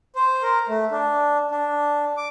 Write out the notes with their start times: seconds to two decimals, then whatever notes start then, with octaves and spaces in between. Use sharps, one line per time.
0.16 C5
0.43 A#4
0.68 A3
0.91 D4
1.51 D4
2.17 D6